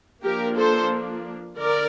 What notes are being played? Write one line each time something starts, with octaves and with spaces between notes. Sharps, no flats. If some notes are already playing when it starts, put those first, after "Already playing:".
F3 A#3 D4 G4 A#4
A4 C5
D3 A#4 D5